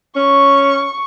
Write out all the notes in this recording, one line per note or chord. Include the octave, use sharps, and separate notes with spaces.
C#4 C#6